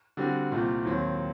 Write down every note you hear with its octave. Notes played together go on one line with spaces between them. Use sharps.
D3 G3 C4 F#4
C2 A#2 A3 C4
D#2 D#3 F#3 C4